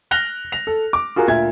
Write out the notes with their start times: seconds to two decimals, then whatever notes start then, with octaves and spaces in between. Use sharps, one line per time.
0.11 F6 F#6 A#6 F7 G7
0.52 A#6 F7
0.67 A4
0.93 D6
1.16 F4 F#4 G#4 A#4
1.28 D2 A#2 E5 G#6